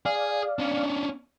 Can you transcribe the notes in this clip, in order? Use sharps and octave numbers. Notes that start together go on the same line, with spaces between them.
G#4 D5 F5
C#4 D4